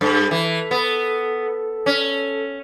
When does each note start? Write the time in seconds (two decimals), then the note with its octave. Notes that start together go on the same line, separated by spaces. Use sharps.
0.01 G2 A4
0.31 E3
0.71 B3
1.86 C#4